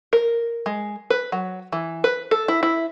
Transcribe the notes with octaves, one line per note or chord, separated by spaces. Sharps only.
A#4
G#3
B4
F#3
E3
B4
A4
E4
E4